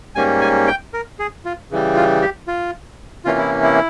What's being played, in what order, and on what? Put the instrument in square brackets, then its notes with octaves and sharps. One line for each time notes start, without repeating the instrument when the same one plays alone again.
[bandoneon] G#2 G3 A#3 C#4 G#5
G#5
G5
A#4
G#4
F4
C#3 E3 G3
F4
G4
F4
C3 E3 A#3 C#4 F4
E4
E4